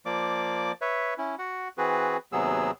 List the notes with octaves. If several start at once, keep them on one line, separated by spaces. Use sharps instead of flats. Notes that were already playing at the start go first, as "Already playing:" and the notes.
F3 A#3 D5 D6
B4 C#5 E5
C#4 E4
F#4 F#5
E3 C4 F#4 G#4 B4
D#2 C3 F#3 B3 G#4 E6